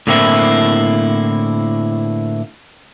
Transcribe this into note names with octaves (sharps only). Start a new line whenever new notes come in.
A2 D3 A#3 C4 E4